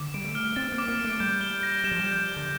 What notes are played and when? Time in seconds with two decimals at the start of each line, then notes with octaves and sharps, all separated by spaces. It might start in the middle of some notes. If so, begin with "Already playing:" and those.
Already playing: D3 D6
0.14 G3 D7
0.24 A3
0.35 F6
0.56 C4 A6
0.72 A#3
0.78 D6
0.88 A#3
1.00 A3 D7
1.20 G3 G6
1.41 G7
1.63 A#6
1.84 G3 E7
1.92 F3
1.99 G3
2.05 G6
2.26 G7
2.36 D3